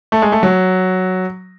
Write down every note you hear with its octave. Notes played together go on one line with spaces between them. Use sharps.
A3
G#3
A3
F#3